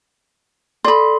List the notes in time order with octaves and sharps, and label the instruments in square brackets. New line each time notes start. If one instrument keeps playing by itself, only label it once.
[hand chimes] A4 C6 [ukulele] D5 B5